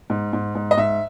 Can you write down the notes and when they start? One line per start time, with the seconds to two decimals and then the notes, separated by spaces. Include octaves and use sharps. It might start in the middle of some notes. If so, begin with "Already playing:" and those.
0.10 G#2
0.33 G#2
0.55 G#2
0.71 D#5
0.77 G#2 E5